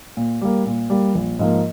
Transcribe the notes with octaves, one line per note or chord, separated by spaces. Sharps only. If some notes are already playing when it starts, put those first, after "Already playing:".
A#2
G3 A#3
A#2
G3 A#3
A#1
G#2 F3 A#3